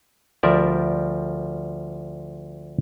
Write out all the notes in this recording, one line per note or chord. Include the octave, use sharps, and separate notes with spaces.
D2 F3 G3 A#4 D5 E5